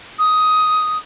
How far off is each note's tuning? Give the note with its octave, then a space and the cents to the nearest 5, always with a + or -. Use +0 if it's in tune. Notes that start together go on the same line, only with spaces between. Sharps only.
D#6 +10